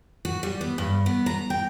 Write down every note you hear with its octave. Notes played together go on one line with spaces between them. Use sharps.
F#4
G3
B3
G2
B3
A#5
G5